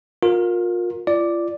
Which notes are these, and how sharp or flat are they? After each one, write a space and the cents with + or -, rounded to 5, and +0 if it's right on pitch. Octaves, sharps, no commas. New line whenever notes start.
F4 +30 A#4 +0
F4 -35 D5 +0